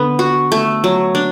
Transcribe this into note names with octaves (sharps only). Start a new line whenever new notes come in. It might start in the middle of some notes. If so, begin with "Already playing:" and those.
Already playing: D3 B3
F#4
A3
F#3
D4